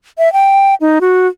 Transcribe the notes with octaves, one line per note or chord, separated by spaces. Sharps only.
E5
G5
D#4
F#4